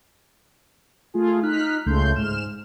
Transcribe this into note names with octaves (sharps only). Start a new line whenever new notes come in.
A3 F4 G#4
D#4 F6 F#6 B6
C#2 C#3 A3 C6 G6
G#2 F6 E7